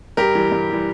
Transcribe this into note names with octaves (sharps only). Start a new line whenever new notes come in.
G2 G4 A#4
E3 G3
G2
E3 G3